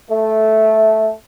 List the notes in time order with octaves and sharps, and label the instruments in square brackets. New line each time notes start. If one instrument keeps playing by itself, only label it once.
[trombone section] A3